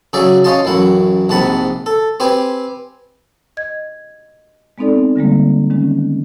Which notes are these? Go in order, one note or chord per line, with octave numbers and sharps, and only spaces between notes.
C#3 F#3 G#4 D5 E5
C#4 F4 D#5 F5 A5
A1 F#2 E4 F#5
A#1 G#2 C3 F#5 A5 B5
A4
C4 G4 B4 G#5
D#5 G#6
G#3 B3 C4 D#4 A4 D5
D3 G3 G#3 A#3
D#3 G#3 C#4